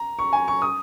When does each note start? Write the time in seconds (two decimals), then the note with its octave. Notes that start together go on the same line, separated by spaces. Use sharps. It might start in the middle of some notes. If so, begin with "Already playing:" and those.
Already playing: A#5
0.19 C#6
0.33 G#5
0.48 C#6
0.62 D#6